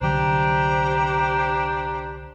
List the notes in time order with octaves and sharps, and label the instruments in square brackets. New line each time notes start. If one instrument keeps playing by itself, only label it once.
[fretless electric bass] C2 D3 F#3 [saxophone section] D4 G4 C5 [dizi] A#5